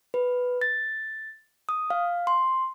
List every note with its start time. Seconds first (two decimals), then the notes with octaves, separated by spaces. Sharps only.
0.14 B4
0.61 A6
1.69 D#6
1.90 F5
2.27 C6